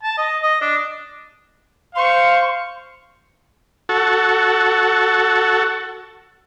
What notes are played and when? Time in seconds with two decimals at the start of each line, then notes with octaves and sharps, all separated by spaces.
0.03 A5
0.17 D#5
0.42 D#5
0.61 D4
1.95 C5 F5 C6 C#6
3.89 F#4 A4